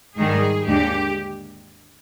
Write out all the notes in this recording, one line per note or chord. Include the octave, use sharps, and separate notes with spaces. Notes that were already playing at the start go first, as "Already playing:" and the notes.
G#2 D#3 G3 G#4
D#2 D3 G#3 G4